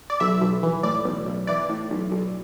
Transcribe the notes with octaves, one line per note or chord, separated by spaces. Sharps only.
D5
B1 E5
B1
E3
A2 D5
B1
B1
E3 D5
A2
B1
B1